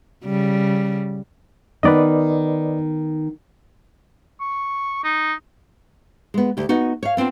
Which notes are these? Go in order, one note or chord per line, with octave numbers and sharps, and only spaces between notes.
C#3 G3
D#3 B3 D#4 B4 D5 D#5
C#6
D#4
G#3 B3
D2 G4
B3 D#4 F#4
C#5 F5
B3 C4 D4 F4